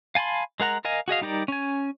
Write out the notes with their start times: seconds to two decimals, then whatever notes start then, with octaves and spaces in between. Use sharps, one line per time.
0.15 F5 G#5 A5 B5 C6
0.60 G#3 A#4 F#5 A#5
0.85 A#4 D#5 F5 G#5
1.08 F#4 G#4 D#5 F5
1.21 G3 D#4 G4 A#4 D5
1.48 C#4 G#5